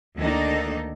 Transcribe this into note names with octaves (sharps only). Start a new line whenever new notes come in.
D2 D#3 A#3 D4 D#4 A4